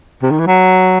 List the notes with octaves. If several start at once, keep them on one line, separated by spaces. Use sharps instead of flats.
C3
D#3
E3
F#3